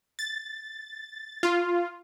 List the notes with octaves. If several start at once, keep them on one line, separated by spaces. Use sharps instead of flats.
A6
F4